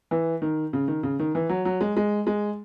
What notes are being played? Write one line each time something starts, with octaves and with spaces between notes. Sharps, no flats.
E3
D#3
C#3
D#3
C#3
D#3
E3
F#3
F#3
G#3
G#3
G#3